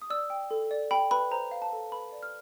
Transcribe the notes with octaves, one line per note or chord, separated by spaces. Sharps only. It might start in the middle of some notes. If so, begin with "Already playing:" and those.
D#6
D5 E6
G5
A4
D5
G5 B5
B4 B5
C5 A#5
F5
A5
A4
B4 B5
D5
F6